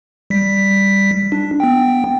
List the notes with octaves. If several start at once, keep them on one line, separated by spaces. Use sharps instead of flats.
G3 B6
D4
B3 G5